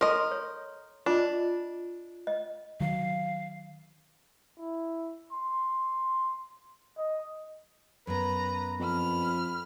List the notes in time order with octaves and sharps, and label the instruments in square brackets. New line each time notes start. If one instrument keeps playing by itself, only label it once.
[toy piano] A4 C6 C#6 [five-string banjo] A#4 D#5
[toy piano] C#5
[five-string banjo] D4 [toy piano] F4 D#5
[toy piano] D#5
[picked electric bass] D#3 F#3 [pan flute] F5
[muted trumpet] E4
C6
D#5
[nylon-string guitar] F#2 B3 [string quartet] B4 A#5
[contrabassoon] F2 [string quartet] B5 F6